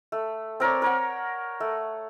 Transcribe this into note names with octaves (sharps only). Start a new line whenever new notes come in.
A3
C4 A#4 C#5 D5
A#4 C#5 F#5
A3